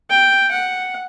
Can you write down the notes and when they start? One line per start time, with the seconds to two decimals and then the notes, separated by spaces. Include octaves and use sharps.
0.10 G5
0.51 F#5